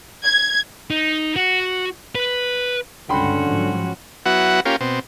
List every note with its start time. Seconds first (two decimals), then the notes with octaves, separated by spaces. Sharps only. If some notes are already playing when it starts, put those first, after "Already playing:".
0.25 G#6
0.90 D#4
1.36 F#4
2.15 B4
3.09 C#2 G2 D3 C#4 F#4 G5 B5 C6
3.45 G#2 F3 F#3
4.26 F#3 B3 E4 F#4 F#5
4.65 A#3 C#4 F4 G4
4.81 B2 C4